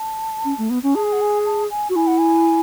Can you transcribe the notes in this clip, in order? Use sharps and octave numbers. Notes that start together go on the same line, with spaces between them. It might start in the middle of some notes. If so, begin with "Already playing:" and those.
Already playing: A5
C#4
A3
B3
C#4
G#4 A5
G#5
F#5
G#5
A5
G#5
F#4
E4 G#5
F#5
G#5